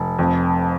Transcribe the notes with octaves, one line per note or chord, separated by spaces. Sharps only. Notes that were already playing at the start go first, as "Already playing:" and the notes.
Already playing: F1
F2